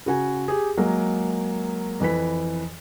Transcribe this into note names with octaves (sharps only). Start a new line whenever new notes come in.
C#3 F#4 G#5
G4 G#4
F#3 G#3 A#3
F2 E3 B4 B6